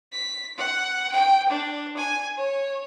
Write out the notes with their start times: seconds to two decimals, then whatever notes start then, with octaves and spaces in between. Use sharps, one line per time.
0.12 B6
0.57 F#5
1.12 G5
1.49 D4
1.97 G#5
2.37 C#5